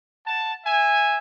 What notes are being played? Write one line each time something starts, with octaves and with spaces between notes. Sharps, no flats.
F#5 A5
E5 G#5